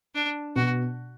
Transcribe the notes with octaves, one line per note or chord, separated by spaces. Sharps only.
D4
B2 F#4